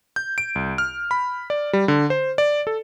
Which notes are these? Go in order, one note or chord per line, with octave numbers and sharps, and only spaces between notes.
G6
D7
C2
F6
B5
D5
G3
D3
C5
D5
A4